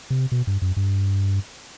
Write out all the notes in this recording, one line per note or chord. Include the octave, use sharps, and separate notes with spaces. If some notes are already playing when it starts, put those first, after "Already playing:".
C3
B2
G2
F#2
G2